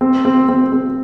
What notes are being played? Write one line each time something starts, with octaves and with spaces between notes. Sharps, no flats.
C4
C4
C4
C4